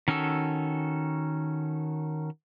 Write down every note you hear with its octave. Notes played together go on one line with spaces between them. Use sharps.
D#3 C#4 F#4 A4 E6